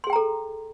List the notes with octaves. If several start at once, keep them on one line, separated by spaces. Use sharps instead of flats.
G#4 A4 G5 A#5 C6